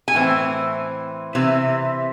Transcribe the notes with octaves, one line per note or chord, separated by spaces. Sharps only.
G#5
A2 E3 C4
C3 E3